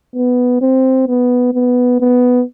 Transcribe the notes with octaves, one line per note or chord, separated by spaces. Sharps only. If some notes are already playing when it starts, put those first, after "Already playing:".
B3
C4
B3
B3
B3